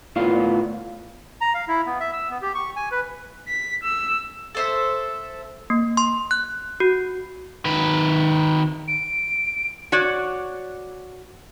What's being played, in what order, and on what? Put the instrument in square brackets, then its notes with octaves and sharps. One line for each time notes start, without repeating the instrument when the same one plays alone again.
[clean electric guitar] A2 B3 F4 F5
[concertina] A#5
F5
E4
B3
E5
E6
B3
G4
C#6
G#5
B4
[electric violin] B6
E6
[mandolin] A4 C5 E5
[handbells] A#3
C6
F#6
F#4
[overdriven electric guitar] D#3 B4
[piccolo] D7
[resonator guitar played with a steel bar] F#4 C#5 D5